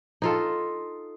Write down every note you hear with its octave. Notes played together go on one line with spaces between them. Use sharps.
D#4 F4 A4